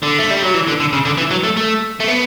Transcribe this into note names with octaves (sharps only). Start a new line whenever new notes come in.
D3
A3
G3
F#3
E3
D3
D3
C#3
D3
E3
F#3
A3
A3
A3
B3